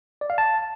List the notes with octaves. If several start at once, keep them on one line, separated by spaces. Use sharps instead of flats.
D5
F5
A5